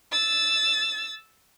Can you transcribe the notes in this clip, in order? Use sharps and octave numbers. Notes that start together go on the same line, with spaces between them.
E6 A6